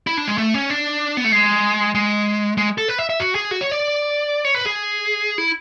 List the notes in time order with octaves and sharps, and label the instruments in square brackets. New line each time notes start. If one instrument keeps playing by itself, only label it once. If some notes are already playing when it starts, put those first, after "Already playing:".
[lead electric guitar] E4
D4
G#3
A3
C#4
D4
B3
A3
G#3
G#3
G#3
A4
B4
E5
E5
F#4
G#4
F#4
C#5
D5
C#5
B4
G#4
E4